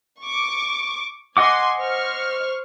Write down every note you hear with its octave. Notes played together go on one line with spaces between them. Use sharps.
C#6 D6
D#5 F#5 G#5 C6 D6
C5 C#6 F6